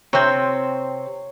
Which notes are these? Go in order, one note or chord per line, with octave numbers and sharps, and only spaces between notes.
C3 C4 C#5